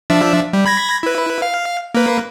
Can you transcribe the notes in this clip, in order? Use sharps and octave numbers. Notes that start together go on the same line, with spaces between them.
F3 D4 E5
G3
B5 G#6 A#6
E4 B4
F5
A#3 B4